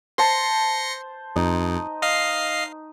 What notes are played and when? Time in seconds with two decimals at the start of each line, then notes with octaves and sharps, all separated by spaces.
0.18 C5 A5 C6 A#6 C#7
1.36 F2 D#4
2.02 D#5 F5 C7